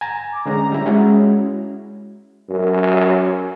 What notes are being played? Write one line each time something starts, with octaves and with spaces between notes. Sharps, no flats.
G#5 A#5
D6
D3 G#3 C#4 A#5
G3 E4
G#3 C#4 E4 F#4
F#2